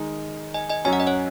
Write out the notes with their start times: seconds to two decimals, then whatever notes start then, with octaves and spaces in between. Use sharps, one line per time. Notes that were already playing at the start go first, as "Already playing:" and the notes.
Already playing: D#3 G#3 D#4
0.54 D#5 G#5
0.69 D#5 G#5
0.85 F#2 F#3 C#4 G#5
0.93 F#5
1.00 D#5
1.07 C#5 F#5